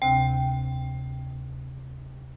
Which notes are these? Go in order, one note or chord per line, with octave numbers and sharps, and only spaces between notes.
D2 C3 C4 G5